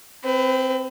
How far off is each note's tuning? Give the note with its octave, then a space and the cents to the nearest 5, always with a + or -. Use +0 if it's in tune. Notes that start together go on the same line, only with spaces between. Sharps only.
C4 +0 B4 +30